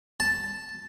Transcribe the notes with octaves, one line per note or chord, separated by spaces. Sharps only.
A5